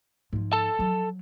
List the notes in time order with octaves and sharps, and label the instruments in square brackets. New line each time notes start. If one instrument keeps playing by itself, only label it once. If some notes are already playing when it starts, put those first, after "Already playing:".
[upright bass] G#2 F3
[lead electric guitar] A4 A5
[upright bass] F3 F#3